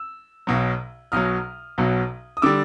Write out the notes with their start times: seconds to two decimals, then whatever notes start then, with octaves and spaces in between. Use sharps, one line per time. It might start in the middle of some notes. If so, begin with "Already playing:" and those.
Already playing: E6
0.47 B1 B2 F#3
1.12 B1 B2 F#3 D#6 F6
1.78 B1 B2 F#3
2.37 D#6
2.42 D3 G3 D6 E6